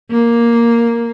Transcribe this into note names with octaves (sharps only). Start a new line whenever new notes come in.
A#3